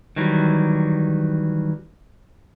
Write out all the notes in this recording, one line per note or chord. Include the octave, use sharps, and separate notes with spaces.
D#3 E3 F#3 G3